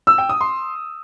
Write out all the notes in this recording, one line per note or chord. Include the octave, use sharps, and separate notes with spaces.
E6
G5
D#6
C6